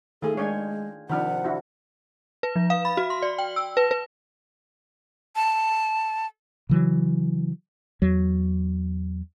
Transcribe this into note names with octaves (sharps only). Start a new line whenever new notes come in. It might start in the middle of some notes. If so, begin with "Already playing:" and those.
D#3 A3 F4 G#4 A4
G#3 D4 C#5 F5 G5 G#5
C3 D#3 F3 D4 F#5 B5 F6
D4 E4 F#4
B4
F3
F5
B5
F#4
C6
D5
G5
E6
B4
B4
A5
C#3 E3 F#3
E2 F#3